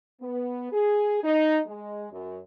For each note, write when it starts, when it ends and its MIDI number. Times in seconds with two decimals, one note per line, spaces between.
0.21 0.69 59
0.72 1.19 68
1.24 1.59 63
1.66 2.06 56
2.12 2.38 42